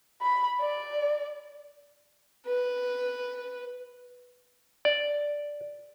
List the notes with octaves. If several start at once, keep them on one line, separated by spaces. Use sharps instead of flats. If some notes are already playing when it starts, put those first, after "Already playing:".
B5
D5
B4
D5